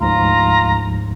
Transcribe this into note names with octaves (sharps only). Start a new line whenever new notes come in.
D2 G#2 F3 F4 A#5